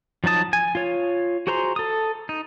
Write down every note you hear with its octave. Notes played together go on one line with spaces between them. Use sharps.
F3 F#3 D#4 A5 D#6
G#5
F4 C#5
F#4 G#4 C5 A#5 C6
A4 D#6
D#4